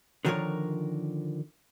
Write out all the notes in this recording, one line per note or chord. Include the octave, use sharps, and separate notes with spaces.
D3 D#3 F3 A4 A#4 C#5